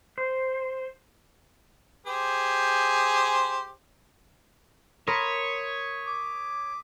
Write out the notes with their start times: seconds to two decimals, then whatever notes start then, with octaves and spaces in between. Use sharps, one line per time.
0.18 C5
2.07 G4 G#4 C5
5.08 A#4 C#5 B5 C6 D#6 B6 D#7
6.07 D6